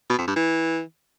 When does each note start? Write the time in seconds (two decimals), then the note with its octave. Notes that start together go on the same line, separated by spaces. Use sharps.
0.10 B2
0.18 F2
0.27 G2
0.36 E3